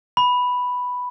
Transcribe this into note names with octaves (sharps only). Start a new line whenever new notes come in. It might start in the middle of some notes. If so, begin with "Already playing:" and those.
B5